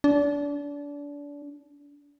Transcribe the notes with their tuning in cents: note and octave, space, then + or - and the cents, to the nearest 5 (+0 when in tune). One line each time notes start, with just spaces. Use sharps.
D4 -30